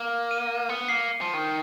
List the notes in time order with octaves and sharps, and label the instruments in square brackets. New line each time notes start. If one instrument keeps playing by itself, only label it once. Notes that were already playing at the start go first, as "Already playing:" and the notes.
Already playing: [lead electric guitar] A#3
[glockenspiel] D#7
[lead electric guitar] B3 [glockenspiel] C#7
[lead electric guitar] A#3 [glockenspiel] C7
[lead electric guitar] F3
D#3